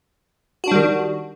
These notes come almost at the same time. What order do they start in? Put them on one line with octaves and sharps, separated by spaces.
F#4 D4 G3 D#3